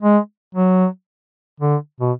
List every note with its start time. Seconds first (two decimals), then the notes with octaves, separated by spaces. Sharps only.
0.03 G#3
0.55 F#3
1.60 D3
2.01 B2